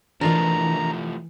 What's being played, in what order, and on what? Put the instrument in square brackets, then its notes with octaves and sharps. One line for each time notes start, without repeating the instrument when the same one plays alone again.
[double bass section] E3 [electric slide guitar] F3 A3 [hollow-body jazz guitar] D4 F4 A#4 [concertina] A#5